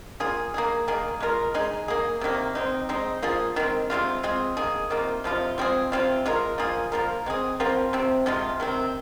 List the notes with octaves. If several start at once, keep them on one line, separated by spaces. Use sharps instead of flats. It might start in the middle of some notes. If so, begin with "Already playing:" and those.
A#3 F4 G#4
A#3 D#4 G#4
D#3 A#3 D#4 G#4
G#3 F4 A#4
G#3 D#4 G#4
A#3 G#4
C3 D#3 A#3
G#3 C4 D#4
G#3 C4 D#4
F3 A#3 F4 G#4
D#3 G#3 C4
C3 D#3 G#3 F4
G#3 C4 F4 G#4
D#3 A#3 G#4
C3 D#3 A#3 F4
C3 F3 G#3 F4
F3 G#3 C4 G#4
C3 F3 C4 F4
G#3 F4 A#4
F3 A#3 F4 G#4
F3 A#3 F4 A#4
G#3 C4 G#4
F3 C4 F4 A#4
C3 F3 C4
C3 F3 G#3 F4
C3 D#3 C4